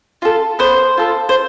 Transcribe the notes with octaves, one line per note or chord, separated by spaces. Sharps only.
F4 A4
B3 C5
F4 A4
C5